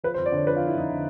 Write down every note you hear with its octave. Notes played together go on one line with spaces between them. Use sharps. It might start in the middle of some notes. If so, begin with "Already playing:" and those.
F3 B4
C5
F2
D5
D3 C#5
F2 B4
F4
F3
E4
F2 D#4
D3